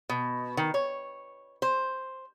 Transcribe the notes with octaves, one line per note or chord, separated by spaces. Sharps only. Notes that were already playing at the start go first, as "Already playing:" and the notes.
B2
D#3
C#5
C5